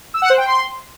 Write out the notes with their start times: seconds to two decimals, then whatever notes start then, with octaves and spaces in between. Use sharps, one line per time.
0.14 E6
0.22 F#5
0.30 C5
0.38 G5
0.46 C6